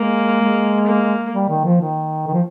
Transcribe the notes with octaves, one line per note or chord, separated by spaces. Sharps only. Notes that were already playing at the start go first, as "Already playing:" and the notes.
Already playing: G#3 A#3
G#3
A#3
G3
D#3
F3
D#3
D#3
F3